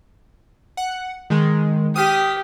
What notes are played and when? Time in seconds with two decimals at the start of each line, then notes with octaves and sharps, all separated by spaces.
0.77 F#5
1.30 D#3 G#3
1.96 G4 D#6 F6 B6